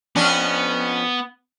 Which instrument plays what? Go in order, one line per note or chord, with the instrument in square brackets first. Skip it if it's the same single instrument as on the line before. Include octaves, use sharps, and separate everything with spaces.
[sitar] F2 C#4 D4 [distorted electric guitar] B3